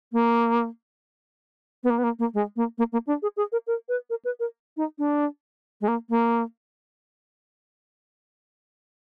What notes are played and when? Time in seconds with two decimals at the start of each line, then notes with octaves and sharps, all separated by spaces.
0.12 A#3
1.84 B3
1.90 A#3
1.98 B3
2.04 A#3
2.19 A#3
2.34 G#3
2.56 A#3
2.78 A#3
2.92 A#3
3.07 D4
3.22 G#4
3.37 G#4
3.52 A#4
3.67 A#4
3.89 B4
4.10 A#4
4.25 B4
4.40 A#4
4.77 D#4
4.98 D4
5.81 G#3
5.88 A#3
6.09 A#3